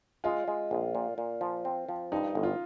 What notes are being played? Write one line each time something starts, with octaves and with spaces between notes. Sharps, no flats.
G#3 F4
G#3
A#1
A#2
A#2
F3
C4
F3
G2 D#4
G1
F4